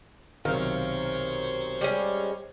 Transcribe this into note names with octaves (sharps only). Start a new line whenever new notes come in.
B1 C3 D#3 C5 C#5 F5
G3 G#3 C#4